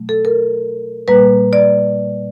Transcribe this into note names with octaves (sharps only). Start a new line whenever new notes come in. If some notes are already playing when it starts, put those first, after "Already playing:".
Already playing: B2 F#3 A3
A4
A#4
A#2 G3 A#3 B4
D5